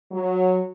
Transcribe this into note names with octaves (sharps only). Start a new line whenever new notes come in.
F#3